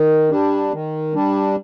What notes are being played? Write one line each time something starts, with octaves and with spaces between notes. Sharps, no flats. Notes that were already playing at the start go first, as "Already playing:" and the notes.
Already playing: D#3
G3 D4
D#3
G3 D4